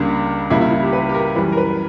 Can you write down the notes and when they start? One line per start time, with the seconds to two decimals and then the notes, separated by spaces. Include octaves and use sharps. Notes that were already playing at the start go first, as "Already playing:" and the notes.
Already playing: C#2 C#3 G3 A#3 D4
0.50 C#2 C#3 G3 A#3 E4
0.61 E4
0.72 E4
0.83 G4
0.93 B4
1.09 G4
1.14 A#4
1.36 F#2 E3 G3 B4
1.52 A#4
1.57 B4